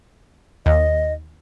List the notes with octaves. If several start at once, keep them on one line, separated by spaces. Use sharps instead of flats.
D#2 D#5